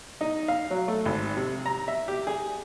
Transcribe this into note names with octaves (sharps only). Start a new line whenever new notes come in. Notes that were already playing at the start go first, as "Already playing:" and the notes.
D#4
F5
F#3
A3
G#1
C3
A#5
E5
G4
G#4